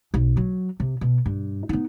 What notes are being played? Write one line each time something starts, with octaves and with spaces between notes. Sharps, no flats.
B1
F#3
C3
B2
G2
B3 D#4